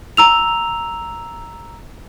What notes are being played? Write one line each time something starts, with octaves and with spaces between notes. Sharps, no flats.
A#5 E6 F7